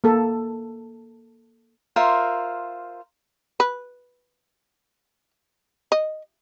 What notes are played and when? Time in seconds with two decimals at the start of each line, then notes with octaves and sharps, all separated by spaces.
0.04 A#3 A4
1.96 F4 A#4 C5 E5
3.60 B4
5.92 D#5